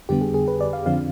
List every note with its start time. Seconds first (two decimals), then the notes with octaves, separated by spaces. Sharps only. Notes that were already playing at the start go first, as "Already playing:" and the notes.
0.09 F2 D3 G3 B3 G4
0.21 G#4
0.34 G#4
0.48 B4
0.61 D5
0.73 F5
0.86 F2 D3 F3 C4 F5